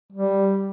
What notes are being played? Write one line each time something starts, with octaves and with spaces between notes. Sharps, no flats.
G3